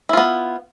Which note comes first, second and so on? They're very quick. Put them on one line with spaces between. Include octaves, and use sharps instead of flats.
E4 F4 B3